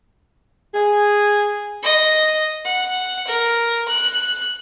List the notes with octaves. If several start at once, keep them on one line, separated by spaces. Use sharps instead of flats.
G#4
D#5
F#5
A#4
F#6